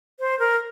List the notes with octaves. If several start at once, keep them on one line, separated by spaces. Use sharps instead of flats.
C5
A#4